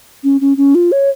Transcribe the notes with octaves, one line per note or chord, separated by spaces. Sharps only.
C#4
C#4
C#4
F4
C#5